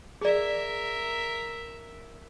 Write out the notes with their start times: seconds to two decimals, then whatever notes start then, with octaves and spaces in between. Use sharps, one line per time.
0.21 G#4 A#4 D5 E5